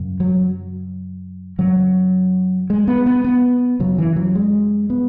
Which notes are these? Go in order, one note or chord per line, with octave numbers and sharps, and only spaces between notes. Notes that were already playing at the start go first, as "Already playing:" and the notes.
Already playing: F#2 C#3
F#3
F#2 C#3 F#3
G#3
B3
B3
B3
F#2 C#3 F#3
E3
F#3
G#3
B3